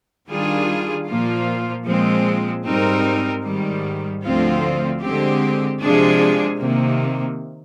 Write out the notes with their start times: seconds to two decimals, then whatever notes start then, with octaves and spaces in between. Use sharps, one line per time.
0.28 D#3 G3 D4 F4 G#4
1.06 A#2 F3 A#3 F4
1.86 A#2 F3 G#3 C4
2.65 G#2 G3 C4 D#4 A#4
3.44 G#2 D#3 G3
4.23 D2 D3 F3 C4 F4
5.02 D3 G#3 C4 G4
5.81 C3 F3 G#3 D4 G#4
6.59 C3 D#3 A#3